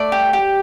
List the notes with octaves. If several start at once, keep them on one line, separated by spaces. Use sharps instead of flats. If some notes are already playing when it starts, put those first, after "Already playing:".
Already playing: A3 D5
G4
G4